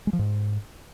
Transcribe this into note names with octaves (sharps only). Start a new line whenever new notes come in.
G#3
F3
G#2